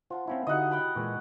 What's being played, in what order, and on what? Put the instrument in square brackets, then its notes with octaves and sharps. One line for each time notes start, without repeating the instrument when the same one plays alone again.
[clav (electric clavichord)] F4 [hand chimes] C5 F#5 A5
[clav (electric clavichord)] C4 C#4 E4 [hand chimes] E5 F5 B5
[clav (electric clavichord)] D3 D#4 [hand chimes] E4 F#4 G4 [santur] D#5 F#5
[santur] F#5 G5 B5
[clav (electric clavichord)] A#2 E3 G#3 [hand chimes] C#6